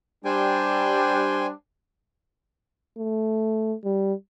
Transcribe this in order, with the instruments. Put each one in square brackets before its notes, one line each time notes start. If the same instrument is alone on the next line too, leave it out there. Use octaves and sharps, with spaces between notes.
[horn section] G3 D4 [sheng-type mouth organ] C5 G5 G#5
[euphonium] A3
G3